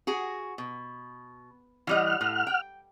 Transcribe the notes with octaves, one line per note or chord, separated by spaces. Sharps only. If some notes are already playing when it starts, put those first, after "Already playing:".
F#4 G#4
B2
E3 G3 D#5 F#5 F6
A2
G5